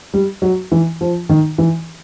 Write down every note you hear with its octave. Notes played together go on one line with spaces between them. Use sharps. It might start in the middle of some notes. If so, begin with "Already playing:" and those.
G3
F#3
E3
F3
D#3
E3